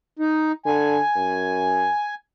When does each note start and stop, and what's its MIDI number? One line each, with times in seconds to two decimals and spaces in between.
0.19 0.52 63
0.66 0.99 50
0.66 2.14 80
1.16 1.88 42